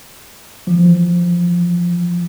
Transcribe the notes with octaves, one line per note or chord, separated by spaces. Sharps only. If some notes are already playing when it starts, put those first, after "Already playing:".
E3 F3